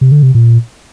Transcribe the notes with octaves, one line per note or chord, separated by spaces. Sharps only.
C3
D3
C3
A#2